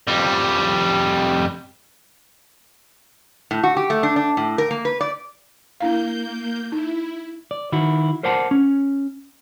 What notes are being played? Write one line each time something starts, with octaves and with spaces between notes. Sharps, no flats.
F2 G3
A2
F#4
G4
A3
D4
D4
A2
A#4
A#3
B4
D5
A#3 D4 E4 F5 G6
D#4 E4
D5
D#3 E4 F#4
A#4 C5 D5 F#5 A5
C#4